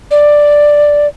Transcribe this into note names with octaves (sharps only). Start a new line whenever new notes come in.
D5